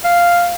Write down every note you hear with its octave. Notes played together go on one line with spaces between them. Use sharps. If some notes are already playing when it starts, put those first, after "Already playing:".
F5